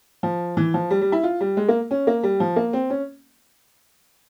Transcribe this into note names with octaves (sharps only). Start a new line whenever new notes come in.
F3
E3
F3
G3
G3
E4
F4
G3
G#3
A#3
C#4
A#3
G3
F3
A#3
C4
C#4